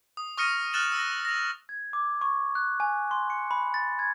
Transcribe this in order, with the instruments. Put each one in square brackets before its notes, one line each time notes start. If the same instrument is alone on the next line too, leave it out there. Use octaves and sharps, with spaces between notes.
[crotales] D#6
C#6 D#6 F6 A#6 C#7 D#7
F6 F#6 A6 E7 F#7
E6 A#6
A#6 F7
[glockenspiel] G#6
D6
C#6
F#6
G#5
C6
C#7
B5
A6
G#6